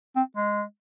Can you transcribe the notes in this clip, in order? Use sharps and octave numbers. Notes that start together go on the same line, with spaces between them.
C4
G#3